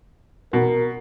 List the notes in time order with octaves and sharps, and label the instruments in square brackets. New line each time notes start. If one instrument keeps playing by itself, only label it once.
[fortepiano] B2 [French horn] A#4